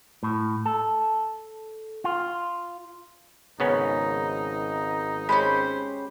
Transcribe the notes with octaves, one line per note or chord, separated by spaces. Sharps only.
A2
A4
F4
G#1 C#3 B3 C#4 D#4
G#3 C#4 G4 C5 B5